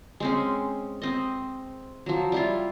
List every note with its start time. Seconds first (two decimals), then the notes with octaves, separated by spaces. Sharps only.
0.20 G#3 C4 C#4
1.02 C4 D#5
2.06 F3 F#3
2.32 G3 E4 F4